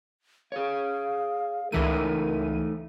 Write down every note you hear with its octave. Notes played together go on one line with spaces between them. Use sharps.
G#4 C#5 F5
C#2 E3 A3 D#4 A#4 E5 D#7